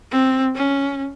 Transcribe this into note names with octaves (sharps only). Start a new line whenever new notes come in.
C4
C#4